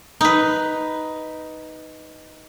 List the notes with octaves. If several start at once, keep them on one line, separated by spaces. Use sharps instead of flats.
D#4 B4